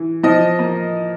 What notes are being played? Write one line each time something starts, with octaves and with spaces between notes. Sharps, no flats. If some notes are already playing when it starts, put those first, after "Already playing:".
Already playing: E3
F3 D#5
A#3